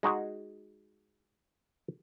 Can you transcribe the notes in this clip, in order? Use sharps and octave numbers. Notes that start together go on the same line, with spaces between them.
G#3 D#4 F#4 G#4